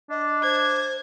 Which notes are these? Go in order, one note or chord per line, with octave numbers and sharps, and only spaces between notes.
D4 D#5
C5 G#6